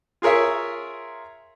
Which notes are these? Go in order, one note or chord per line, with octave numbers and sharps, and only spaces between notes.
F4 G#4 A#4 C#5 E5